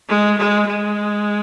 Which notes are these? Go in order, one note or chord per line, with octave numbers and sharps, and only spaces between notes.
G#3
G#3
G#3